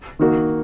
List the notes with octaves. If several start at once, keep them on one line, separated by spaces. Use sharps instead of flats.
D#3 A#3 D#4 F#4